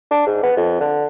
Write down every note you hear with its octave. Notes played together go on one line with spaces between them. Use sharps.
D4
G#2
B3
F2
D3